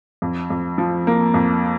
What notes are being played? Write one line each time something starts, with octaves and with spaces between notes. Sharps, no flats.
F2
F2
F3
A#3
F2